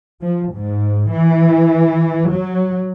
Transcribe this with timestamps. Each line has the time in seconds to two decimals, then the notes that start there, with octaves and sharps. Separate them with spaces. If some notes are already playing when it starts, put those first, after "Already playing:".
0.22 F3
0.55 G#2
1.13 E3
2.32 F#3